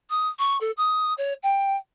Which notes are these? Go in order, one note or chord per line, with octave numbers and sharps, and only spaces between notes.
D#6
C#6
A4
D#6
C#5
G5